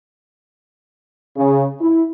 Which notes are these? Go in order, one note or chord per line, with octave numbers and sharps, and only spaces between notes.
C#3
E4